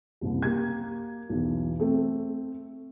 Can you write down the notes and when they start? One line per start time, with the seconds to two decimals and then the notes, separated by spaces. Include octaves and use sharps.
0.21 F#1 C2
0.42 A#3 G4 G#6
1.29 B1 E2
1.80 A3 C4